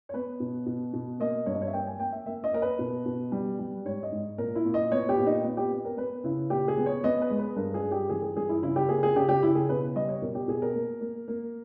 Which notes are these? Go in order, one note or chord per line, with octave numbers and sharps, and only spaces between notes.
C#5
B3 B4
B2
B2
B2
A#3 D#5
G2 C#5
D#5
C#5
E5
A#3 G5
G#5
A#3 G5
E5
A#3 E5
D#5
A#3 A#4
B4
B2
B2
G3
G3
G#2 C#5
D#5
G#2
A#2 A#4
E4
A#2
D#5
B3 C#5
G4
A#2
D#4
B3
G4
B3
A#4
B3 B4
C#3 E4
A#2 G4
G#4
B3
C#5
B3 D#5
B4
G#3
B4
G2 A#4
G#4
G2
G4
E3 G#4
G#4
G2 G#4
E4
C#3 E4
G4
A#3 G#4
G#4
C#3 G4
G4
C#3 E4
G#4
B2 B4
G3 D#5
C#5
B2 A#4
G4
B2 G#4
A#4
A#3
A#3
A#3